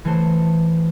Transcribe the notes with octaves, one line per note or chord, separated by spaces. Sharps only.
E3 A3 C5 E7